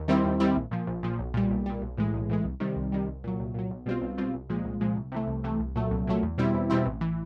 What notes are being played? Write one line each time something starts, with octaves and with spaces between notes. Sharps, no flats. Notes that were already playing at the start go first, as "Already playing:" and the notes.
Already playing: D#2
D#3 G3 C4 E4
D#2
D#3 G3 C4 E4
A#1
A#2 F3
A#1
A#2 F3
B1
A#2 G3
B1
A#2 G3
B1
A2 E3 G#3
B1
A2 E3 G#3
C2
C3 D#3 G3
C2
C3 D#3 G3
C2
A#2 F#3
C2
A#2 F#3
B1
B2 G3 C4 F4
B1
B2 G3 C4 F4
C2
A#2 F3 G#3
C2
A#2 F3 G#3
C2
C3 E3 A3
C2
C3 E3 A3
C2
A#2 F#3 A3
C2
A#2 F#3 A3
E2
B2 G3 C4 E4
E2
B2 G3 C4 E4
A1
E3